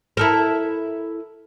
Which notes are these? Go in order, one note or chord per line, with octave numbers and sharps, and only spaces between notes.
E4 A4 A#4